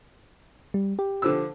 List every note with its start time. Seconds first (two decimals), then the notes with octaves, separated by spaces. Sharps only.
0.74 G3
0.99 G4
1.22 D3 F3 E6